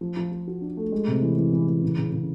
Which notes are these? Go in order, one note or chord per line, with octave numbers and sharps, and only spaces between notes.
F3
F3
F3
F#4
D4
A3
G#3
C3
E3
E3
E3
E3
C#3
C#3
C#3